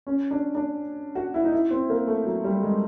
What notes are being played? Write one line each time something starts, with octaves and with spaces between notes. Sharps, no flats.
C#4
D4
D4
F#4
E4
D#4
E4
C4
A#3
A3
F#3
G3
G#3